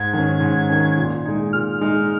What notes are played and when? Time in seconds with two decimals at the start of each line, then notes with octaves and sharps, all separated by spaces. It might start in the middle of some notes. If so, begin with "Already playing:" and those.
Already playing: G#2 G#6
0.13 D#3 C#4
0.40 G#2
0.69 D#3 C#4
0.97 A#2
1.26 G#3 D#4
1.53 A#2 F6
1.81 G#3 D#4